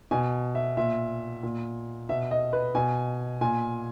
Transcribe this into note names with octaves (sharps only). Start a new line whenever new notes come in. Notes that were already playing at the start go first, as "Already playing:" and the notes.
B2 G#5
E5
A#2 E5
A#2
B2 E5
D#5
B4
B2 G#5
A#2 G#5